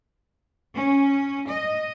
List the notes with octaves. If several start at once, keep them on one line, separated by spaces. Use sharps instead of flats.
C#4
D#5